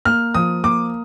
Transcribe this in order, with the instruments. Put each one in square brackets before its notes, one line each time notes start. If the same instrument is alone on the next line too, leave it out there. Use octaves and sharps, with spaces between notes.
[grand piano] A#3 [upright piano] F6
[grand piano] F3 [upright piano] D#6
[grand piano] A#3 [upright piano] D6